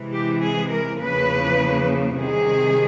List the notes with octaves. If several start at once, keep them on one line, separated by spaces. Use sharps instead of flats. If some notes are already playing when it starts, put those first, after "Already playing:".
Already playing: C3 E3 G#3
G4
G#4
A#4
E2 C#3 F3 A#3 B4
C3 D#3 G3 G#4